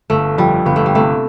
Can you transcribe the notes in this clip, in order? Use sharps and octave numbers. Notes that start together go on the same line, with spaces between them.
G1 A3
F2 G3
G1 B3
A3
G3
C3 A3